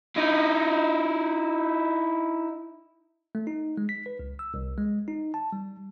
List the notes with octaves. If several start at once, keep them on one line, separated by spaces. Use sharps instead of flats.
D#4 E4
A3
D#4
G#3
B6
B4
C#2
E6
C2
G#3
D#4
A5
G3